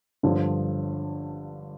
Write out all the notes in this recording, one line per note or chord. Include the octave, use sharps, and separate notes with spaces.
G1 G2 D3 F3